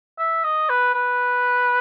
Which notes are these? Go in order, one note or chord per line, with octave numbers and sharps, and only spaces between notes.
E5
D#5
B4
B4